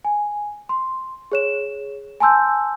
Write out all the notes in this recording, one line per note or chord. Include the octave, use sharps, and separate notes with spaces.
G#5
C6
G#4 C#5 E7
G#5 A5 C6 E6 G6